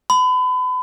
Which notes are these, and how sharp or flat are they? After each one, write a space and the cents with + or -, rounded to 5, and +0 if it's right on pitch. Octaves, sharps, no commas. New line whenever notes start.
B5 +35